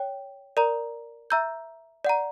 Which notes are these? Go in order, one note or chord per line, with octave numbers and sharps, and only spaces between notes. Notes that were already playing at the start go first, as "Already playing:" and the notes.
Already playing: C#5 G5
A#4 D5 A#5
E5 A#5 E6 G6
D5 F#5 A#5